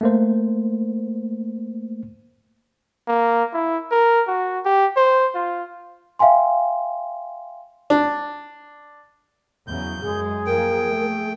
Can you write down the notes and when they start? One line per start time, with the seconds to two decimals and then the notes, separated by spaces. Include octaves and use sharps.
0.01 A3 A#3 C5
3.08 A#3
3.53 E4
3.91 A#4
4.28 F#4
4.65 G4
4.97 C5
5.35 F4
6.19 E5 F5 G5 G#5 C6
7.90 D4
9.67 E2 C#3 F#3 G6
10.01 F#2 G#3 G#4
10.46 F3 A#3 A#4 G5
10.89 A3